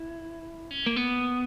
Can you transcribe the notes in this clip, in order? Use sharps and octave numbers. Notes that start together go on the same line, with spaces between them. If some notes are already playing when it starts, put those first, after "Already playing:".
Already playing: E4
C#4
A#3
B3